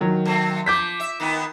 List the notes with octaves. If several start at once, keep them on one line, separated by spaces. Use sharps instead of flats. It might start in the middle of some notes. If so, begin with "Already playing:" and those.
D#3 F#3
A3 C4
F3 D6 G6 B6
E5
D#3 A#3 B3